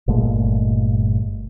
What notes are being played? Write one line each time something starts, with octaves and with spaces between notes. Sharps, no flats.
G1 A#2 G#3 A3